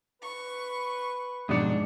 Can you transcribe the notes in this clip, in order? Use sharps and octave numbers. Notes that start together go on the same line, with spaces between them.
B4 C#6
F2 G#2 B2 F#3 D4 G#4 C#7